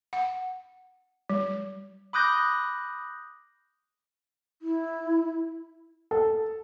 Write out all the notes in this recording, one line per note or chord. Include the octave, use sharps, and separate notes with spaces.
F#5
G3
B5 D6 D#6 F#6 G6 A#6
E4
A4